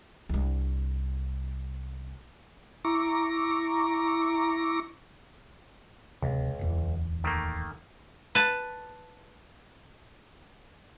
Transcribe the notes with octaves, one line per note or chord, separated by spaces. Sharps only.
C2 D4
E4 A#5 C#6 D6
D1 C#2 C3
D1 E2 E3
D#3 A3 A#3
B4 A5